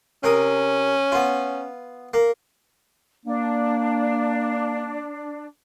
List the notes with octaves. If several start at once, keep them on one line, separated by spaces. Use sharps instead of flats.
C3 C#4 A#4 D#6
B3 F4
A#3
A#3 D4